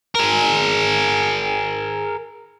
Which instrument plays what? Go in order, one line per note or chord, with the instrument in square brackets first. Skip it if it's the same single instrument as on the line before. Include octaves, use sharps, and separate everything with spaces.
[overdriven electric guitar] G#4 A#4